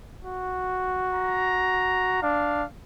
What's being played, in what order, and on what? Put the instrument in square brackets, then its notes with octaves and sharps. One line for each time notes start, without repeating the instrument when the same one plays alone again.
[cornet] F#4
[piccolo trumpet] A#5
[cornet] D4 [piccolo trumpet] F5